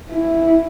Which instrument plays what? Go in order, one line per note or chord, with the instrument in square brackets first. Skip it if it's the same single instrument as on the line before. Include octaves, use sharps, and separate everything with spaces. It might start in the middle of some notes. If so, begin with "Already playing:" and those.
[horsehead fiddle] E4